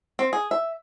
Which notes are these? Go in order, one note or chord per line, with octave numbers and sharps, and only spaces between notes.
C4
G#4
E5